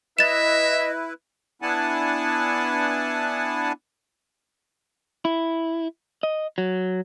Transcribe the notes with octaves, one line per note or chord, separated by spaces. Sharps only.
E4 B4 D#5 E5 A6 E7
B3 D4 E4 F#5 G#5 A5
E4
D#5
F#3